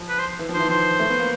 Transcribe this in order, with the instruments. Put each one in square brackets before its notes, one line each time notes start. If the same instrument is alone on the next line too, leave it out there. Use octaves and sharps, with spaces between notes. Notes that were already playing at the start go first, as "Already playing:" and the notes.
Already playing: [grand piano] F3
[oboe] B4
C5
[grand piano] E3
F3
[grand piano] D#3 [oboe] C5
[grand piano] E3
[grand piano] F3 [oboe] C5
[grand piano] A3
B3
A#3